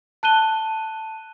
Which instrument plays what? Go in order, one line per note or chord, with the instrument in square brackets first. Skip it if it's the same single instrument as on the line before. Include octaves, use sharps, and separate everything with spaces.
[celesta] A5 F#6 D#7 G7